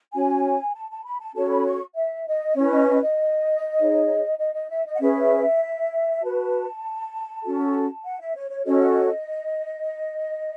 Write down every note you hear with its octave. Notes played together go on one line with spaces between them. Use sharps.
C#4 F#4 C#5 G#5
A5
A5
B5
A5
C#4 F#4 A4 C#5 A5
B5
C#6
E5
D#5
C#4 E4 B4 C#5
D#5
D#5
D#5
D#4 G#4 C#5
D#5
D#5
E5
D#5
F#5
C#4 G#4 B4 E5
F#4 B4 A5
C#4 F#4 A4
F#5
E5
C#5
C#5
C#4 F#4 A4 C#5 D#5